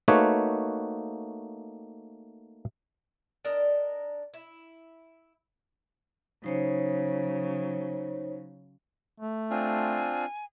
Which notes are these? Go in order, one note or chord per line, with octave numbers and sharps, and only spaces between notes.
A3 A#3 D#4 F#4 B4 C#5
D4 A#4 D#5
E4
C#3 F#3 D#4 C5 C#5
A3
C4 D4 F4 G#5